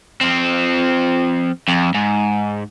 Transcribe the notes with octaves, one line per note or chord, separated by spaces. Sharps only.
F3 C4
F2
G#2